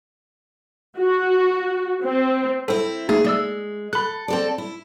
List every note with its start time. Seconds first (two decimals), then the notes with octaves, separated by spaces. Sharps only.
0.98 F#4
2.03 C4
2.68 C4 E4 A4 C5
3.09 A3 A#3 D#4 G#4
3.24 G#3 A3 D5 E6
3.93 A4 B5 F#6
4.28 C4 A4 D5
4.58 E4